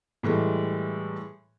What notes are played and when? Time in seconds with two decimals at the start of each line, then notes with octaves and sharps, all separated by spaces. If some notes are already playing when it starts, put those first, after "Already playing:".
0.23 A2 E3 G3 G#3